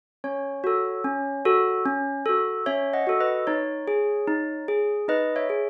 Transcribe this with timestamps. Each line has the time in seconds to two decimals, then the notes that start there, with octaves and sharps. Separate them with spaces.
0.24 C#4 C#5
0.64 F#4 A4
1.04 C#4
1.45 F#4 A4
1.86 C#4
2.26 F#4 A4
2.66 C#4 C#5 E5
2.93 D#5 F#5
3.07 F#4 A4
3.20 B4 D#5
3.47 D#4 C#5
3.88 G#4
4.28 D#4
4.68 G#4
5.08 D#4 B4 D#5
5.36 C#5 E5
5.50 G#4